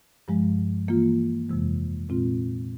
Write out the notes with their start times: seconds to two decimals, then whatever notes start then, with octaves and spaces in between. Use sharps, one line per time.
0.28 G2 F3 G#3
0.88 E3 A#3 F4
1.49 F2 C3 E3 G#3
2.09 A#2 G#3 C4 F4